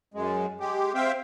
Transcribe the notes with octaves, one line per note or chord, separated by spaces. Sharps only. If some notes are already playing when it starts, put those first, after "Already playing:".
F#2 G#3
G#3 G4
C4 C5 E5 F5 G5